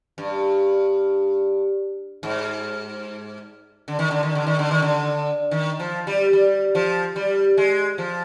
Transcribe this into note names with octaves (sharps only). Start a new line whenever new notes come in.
G2
G#2
D3
D#3
D3
D#3
D3
D#3
D3
D#3
D3
D#3
F3
G3
G3
F3
G3
G#3
F3